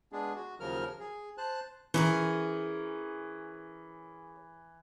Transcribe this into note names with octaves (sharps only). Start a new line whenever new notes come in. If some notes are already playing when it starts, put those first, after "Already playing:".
G#3 B3 D4 G#4
F#4
D#2 C#3 F3 F#3 A#4 F6
G#4
C5 A5 F#6
E3 C#4 G#4 A#4